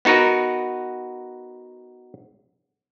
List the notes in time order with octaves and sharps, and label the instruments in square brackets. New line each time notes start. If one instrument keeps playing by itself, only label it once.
[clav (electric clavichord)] B3 D#4 F#4 A#4 B4